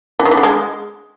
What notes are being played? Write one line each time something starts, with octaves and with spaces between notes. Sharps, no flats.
E3
D#3
E3
D3
G#3